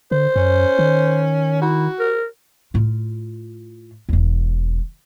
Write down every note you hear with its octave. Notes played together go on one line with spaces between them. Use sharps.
D3 C5
F#2 C#4
D#3
E4 F#4
A#4
A2 F4
E1 E2